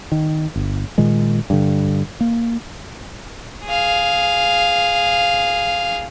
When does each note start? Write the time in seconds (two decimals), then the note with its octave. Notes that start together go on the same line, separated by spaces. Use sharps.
0.12 D#3
0.56 G1
0.98 A#2 D#3 G#3
1.50 G2 D3
2.21 A#3
3.65 G#4 F5